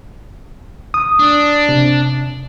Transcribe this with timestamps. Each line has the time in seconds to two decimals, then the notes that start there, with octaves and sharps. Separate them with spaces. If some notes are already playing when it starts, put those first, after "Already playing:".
0.94 D#6
1.19 D4
1.69 C3